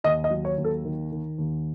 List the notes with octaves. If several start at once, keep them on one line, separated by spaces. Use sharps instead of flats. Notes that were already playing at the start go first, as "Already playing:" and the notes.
D#2 D#5
D#5
F#3
C#5
D#2
A4
D#3
D#3
D#2